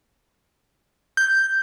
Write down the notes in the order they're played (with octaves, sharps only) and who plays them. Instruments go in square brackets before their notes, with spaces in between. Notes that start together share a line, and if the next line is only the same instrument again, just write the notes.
[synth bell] G6